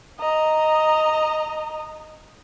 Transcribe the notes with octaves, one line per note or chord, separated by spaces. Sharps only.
D#5 A#5